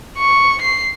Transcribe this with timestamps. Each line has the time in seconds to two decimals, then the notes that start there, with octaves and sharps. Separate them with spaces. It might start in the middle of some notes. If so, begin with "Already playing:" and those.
0.18 C#6
0.62 C7